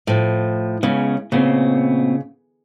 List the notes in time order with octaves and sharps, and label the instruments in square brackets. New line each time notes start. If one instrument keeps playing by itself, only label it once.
[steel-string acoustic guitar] A2 F3
[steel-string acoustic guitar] C#3 [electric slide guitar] G#3 B3 C#4
[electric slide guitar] A#2 B3 C4 [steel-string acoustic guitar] C#3